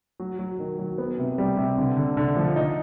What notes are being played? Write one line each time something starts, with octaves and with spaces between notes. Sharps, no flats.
F#3
F#3
D#3
F#3
B3
C3
G3
C3
D3
D3
D3
F3
D#4